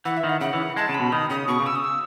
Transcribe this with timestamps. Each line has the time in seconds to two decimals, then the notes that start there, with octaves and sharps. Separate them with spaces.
0.05 E3 F#5
0.17 E5
0.24 D#3
0.29 F#5
0.41 C#3 F#5
0.53 E3
0.76 G#3 A5
0.89 C#3
0.94 B5
1.00 B2
1.12 D#3 D#6
1.30 C#3 D#6
1.48 B2 C#6
1.60 C#3
1.66 E6
1.75 D#6
1.84 E6